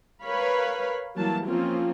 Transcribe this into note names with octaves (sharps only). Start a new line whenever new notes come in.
A#4 B4 C#5 F5 B5
E3 F#3 G3 A#3 A5
F3 A#3 C4 C#4 F4